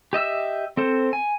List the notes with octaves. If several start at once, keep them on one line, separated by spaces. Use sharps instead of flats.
G4 D#5 E5 E6
C4 A4 C5
G#5